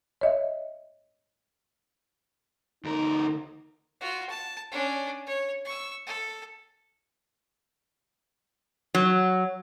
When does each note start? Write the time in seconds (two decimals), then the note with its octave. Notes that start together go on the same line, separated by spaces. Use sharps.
0.21 C#5 D#5 E5
2.85 D2 D#4 A#4
4.01 F4 F#4
4.30 A5
4.72 C#4 D4
5.27 C#5
5.65 C#6 E6
6.07 A4
8.95 F#3